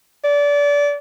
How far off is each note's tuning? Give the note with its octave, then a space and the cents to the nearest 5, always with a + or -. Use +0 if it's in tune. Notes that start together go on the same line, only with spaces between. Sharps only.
D5 -25